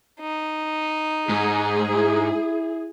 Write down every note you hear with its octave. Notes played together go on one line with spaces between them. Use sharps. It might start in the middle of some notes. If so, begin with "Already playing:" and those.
D#4
G#2 G#4
E4